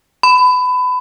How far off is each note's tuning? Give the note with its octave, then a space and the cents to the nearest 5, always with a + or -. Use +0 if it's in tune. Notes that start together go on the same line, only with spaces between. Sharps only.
B5 +25